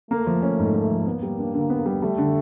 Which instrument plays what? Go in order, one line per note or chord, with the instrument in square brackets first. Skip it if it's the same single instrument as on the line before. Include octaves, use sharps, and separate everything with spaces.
[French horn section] A3 [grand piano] A#3
[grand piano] F3
C#4
G#2
A#3
F3
[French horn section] A#3 [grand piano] B3
[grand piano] G3
D4
D3
B3
G3
[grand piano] G3 [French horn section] A3
[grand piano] D3